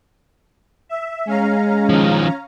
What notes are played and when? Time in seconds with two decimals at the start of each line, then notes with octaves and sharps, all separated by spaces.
0.89 E5
1.27 G#3 C#4 F5 A#5
1.89 D#3 F3